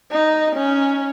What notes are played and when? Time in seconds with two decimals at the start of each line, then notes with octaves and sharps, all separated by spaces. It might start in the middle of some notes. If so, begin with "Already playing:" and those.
0.12 D#4
0.56 C#4